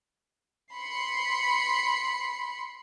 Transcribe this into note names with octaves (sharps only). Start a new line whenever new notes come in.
B5 C6 C7 C#7